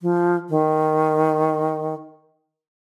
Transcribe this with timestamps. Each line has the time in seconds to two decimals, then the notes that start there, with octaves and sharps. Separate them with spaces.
0.02 F3
0.50 D#3